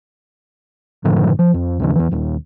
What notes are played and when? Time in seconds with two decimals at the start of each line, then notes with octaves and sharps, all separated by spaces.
1.04 F#2 A2 D3 F3
1.39 F3
1.54 F2
1.80 D#2 C#3 F3
1.95 E2 E3
2.11 D#1 D#2